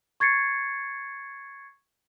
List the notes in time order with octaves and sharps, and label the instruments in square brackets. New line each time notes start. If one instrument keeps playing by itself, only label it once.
[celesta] C#6 G#6 A6 C7 C#7